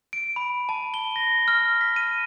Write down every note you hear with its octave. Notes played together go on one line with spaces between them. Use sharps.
D7
B5
A5
G7
A#6
F6
B6
D#7